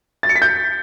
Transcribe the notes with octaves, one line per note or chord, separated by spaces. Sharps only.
A6
C#7
B6
G6